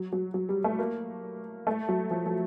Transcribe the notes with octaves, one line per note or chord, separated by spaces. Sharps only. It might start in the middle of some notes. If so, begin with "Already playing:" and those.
Already playing: F#3
F#3
F#3
G3
A3
A#3
A3
F#3
F3
F3